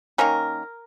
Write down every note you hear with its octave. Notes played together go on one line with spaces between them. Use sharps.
D#3 A#3 C#4 A#4